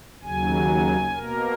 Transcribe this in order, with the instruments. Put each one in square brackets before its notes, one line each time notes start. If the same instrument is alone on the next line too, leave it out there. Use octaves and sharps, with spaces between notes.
[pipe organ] D#2 C#3 F#3 G#5
B2 A#3 A#4